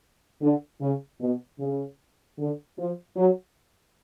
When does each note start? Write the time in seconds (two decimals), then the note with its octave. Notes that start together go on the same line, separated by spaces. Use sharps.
0.40 D3
0.79 C#3
1.19 B2
1.58 C#3
2.37 D3
2.77 F3
3.15 F#3